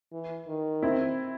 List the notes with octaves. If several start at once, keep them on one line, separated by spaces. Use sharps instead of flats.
E3
D#3
C4 E4